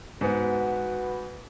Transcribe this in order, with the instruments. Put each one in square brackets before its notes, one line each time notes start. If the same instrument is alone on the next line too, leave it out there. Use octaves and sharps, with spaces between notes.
[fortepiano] G#2 B3 [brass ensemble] F#4 B4